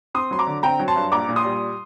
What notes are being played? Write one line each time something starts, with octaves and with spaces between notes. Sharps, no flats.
C4 C6 D#6
F#3 C6
A#5 D6
D3
C4 G5 A#5
F#3
A5 C6
G2
A#1 A#5 D6
A#2
C6 D#6
G3